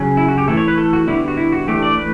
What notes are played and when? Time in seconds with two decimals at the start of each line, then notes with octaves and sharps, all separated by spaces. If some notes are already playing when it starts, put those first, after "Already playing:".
Already playing: C#3 F#3 C#4
0.17 E4
0.28 F#4
0.38 G4
0.48 E3 A3 E4 A4
0.57 C#5
0.68 B4
0.78 A4
0.93 F#4
1.07 D3 G3 B3 E4
1.28 F#4
1.37 E4
1.52 F#4
1.68 E3 A3 D4 G4
1.83 D5
1.97 B4